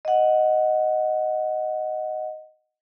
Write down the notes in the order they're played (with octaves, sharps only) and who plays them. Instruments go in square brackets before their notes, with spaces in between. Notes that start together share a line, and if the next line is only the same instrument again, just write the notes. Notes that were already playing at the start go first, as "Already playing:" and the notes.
[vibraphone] D#5 F#5